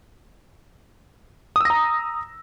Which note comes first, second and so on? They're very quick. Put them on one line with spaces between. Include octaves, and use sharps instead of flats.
D#6 E6 A#6 A#5